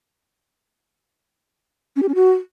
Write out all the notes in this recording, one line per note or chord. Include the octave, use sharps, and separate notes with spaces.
C#4
G4
C#4
F#4